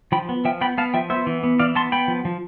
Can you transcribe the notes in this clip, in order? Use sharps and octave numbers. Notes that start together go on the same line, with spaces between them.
F3 G5 B5
B3
F3 E5 G5
B3 G5 B5
B3 F5 A5
F3 E5 G5
B3 C5 E5
E3
B3
E3 D5 F5
B3 A5 C6
B3 G5 B5
F3
F3